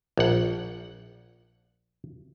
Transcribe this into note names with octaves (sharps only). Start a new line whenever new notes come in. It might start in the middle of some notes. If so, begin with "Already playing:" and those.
A#1 F#5